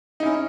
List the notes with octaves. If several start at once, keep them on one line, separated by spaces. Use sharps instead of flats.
C#4 D#4 E4